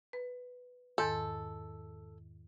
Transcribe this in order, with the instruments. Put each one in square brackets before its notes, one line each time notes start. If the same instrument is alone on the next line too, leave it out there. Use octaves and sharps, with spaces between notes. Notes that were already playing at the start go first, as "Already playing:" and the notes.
[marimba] B4
[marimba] E2 G#2 D#3 [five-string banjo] A4